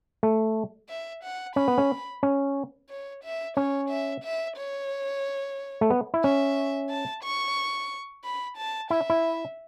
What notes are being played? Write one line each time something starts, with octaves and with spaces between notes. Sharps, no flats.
A3
E5
F#5
C#4 B5
B3
C#4
C#4
C#5
E5
C#4 C#5
E5
E5
C#5
A3
B3
E4
C#4 E5
A5
C#6
B5
A5
E4 E5
E4